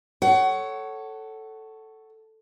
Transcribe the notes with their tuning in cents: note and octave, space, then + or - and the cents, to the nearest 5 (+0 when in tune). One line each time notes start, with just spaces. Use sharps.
A4 +0 C#5 +0 F#5 +25